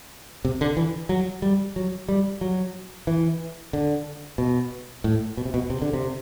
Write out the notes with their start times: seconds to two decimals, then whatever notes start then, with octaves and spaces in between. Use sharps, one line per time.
0.45 C3
0.61 D3
0.77 E3
1.09 F#3
1.42 G3
1.76 F#3
2.09 G3
2.41 F#3
3.07 E3
3.73 D3
4.38 B2
5.04 A2
5.37 B2
5.45 C3
5.54 B2
5.70 C3
5.82 D3
5.93 C3